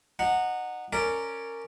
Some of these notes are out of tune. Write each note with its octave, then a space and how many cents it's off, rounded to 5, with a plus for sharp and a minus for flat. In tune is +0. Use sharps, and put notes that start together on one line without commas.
D#4 -25 F#5 -10
C#4 +0 A#4 -15 D5 +0